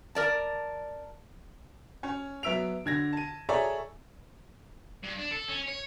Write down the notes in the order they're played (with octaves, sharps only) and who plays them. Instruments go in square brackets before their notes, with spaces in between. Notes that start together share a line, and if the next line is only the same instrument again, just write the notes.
[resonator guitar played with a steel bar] A#4 D5 A5
[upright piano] C#4 C#5
F#3 B3 E5 E6 D7 F7
D3 G#6 A#6
A5 D#7
G#4 A4 C#5 D5 E5 A#5
[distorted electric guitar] G2
D4
A4
C#4
C#5